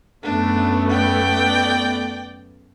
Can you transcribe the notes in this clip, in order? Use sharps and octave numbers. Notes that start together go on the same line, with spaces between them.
F#2 A3 B3 D4
D5 G5